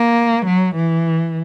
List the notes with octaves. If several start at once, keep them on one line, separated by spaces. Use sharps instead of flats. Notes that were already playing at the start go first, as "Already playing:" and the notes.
Already playing: A#3
F#3
E3